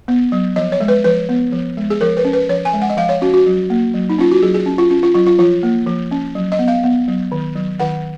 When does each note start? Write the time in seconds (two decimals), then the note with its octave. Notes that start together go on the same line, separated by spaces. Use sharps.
0.08 B3
0.32 F#3
0.56 F3 D#5
0.72 C#5
0.80 G#3
0.88 B4
1.04 F3 B4
1.29 B3
1.52 F3
1.77 G#3
1.90 G#4
2.01 F3 A#4
2.17 B4
2.25 C#4
2.33 B4
2.49 F3 C#5
2.65 G#5
2.73 G#3
2.82 F#5
2.90 D#5
2.97 F3 F5
3.09 C#5
3.21 C#4 F#4
3.34 F#4
3.46 F#3
3.70 A#3
3.94 F#3
4.10 D#4
4.18 C#4 F4
4.31 F#4
4.42 F#3 G#4
4.54 G#4
4.66 C#4
4.78 F4
4.91 C#4 F4
5.03 F4
5.14 F#3 F4
5.27 F4
5.39 F3 F4
5.63 A#3
5.87 F3
6.11 C#4
6.35 F#3
6.52 D#5
6.59 B3
6.68 F5
6.84 B3
7.08 F#3
7.32 D#3
7.56 F#3
7.80 D#3 F#5